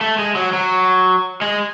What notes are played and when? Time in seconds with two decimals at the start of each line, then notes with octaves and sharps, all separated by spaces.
0.01 A3
0.19 G#3
0.36 F#3
0.53 F#3
1.41 G#3